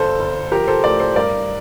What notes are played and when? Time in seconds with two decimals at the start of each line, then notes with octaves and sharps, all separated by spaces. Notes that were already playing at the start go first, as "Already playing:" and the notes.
Already playing: G1 A4 C5
0.20 G1
0.52 F3 G4 A#4
0.67 A4 C5
0.84 A1 A#4 D5
1.00 A4 C5
1.16 G2 A#4 D5